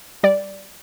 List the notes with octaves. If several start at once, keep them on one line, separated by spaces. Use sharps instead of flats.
G3 D5